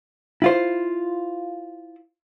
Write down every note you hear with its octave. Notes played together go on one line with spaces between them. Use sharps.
E4 F4 C5